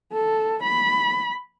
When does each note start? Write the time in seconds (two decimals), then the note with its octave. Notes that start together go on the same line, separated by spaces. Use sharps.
0.13 A4
0.63 B5